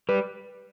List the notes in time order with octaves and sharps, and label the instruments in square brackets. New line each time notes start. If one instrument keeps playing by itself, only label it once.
[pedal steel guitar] G3 [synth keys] B4